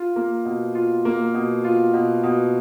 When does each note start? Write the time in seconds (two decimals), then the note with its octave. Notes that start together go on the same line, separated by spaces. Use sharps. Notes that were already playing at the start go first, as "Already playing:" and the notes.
Already playing: F4
0.16 A#3
0.45 B2
0.75 F4
1.05 A#3
1.34 B2
1.64 F4
1.94 B2
2.23 B2